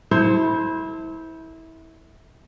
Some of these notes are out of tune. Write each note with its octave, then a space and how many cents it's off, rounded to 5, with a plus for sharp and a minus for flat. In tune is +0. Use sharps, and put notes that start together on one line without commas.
E4 -25 A4 +30 C5 +0